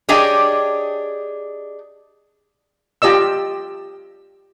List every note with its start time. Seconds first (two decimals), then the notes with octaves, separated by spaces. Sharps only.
0.09 D4 G4 G#4 C#5 D#5 G5
3.02 F4 G4 D5 D#5 E6